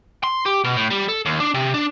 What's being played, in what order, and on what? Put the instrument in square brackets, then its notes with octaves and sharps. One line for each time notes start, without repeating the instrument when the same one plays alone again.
[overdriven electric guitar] C6
G4
B2
A2
G3
A4
D#2
D4
C3
D4